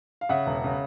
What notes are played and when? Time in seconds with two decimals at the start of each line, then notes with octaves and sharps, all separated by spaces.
0.21 F5
0.29 C#3 E5 F#5
0.46 E1
0.64 C#3